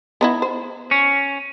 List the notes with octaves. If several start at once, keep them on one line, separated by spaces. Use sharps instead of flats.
B3 D#4 E4
C5
C#4